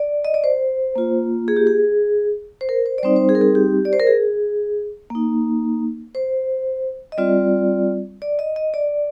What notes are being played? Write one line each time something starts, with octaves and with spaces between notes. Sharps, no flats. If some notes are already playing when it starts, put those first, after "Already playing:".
Already playing: D5
D#5
D5
C5
A#3 F4
G#4
G4
G#4
C5
A#4
C5
D5
G3 C4 D#4 C5
C5
G#4
A#4
G#4
G4
D5
C5
A#4
G#4
A#3 D#4
C5
D#5
G3 C4 F4 D5
D5
D#5
D#5
D5